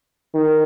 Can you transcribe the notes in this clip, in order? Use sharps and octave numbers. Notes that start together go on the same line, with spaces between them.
D#3